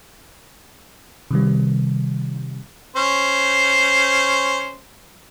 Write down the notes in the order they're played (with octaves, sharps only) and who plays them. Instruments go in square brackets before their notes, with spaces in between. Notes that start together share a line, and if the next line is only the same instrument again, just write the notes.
[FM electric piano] C3 D#3 G3
[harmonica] C#4 C5